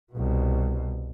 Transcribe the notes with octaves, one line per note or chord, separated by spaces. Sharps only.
C2 B2